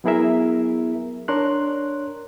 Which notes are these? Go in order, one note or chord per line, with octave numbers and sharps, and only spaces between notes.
F#3 B3 E4 G#4 A#4 E5
D4 A#4 C#5 C6 F#6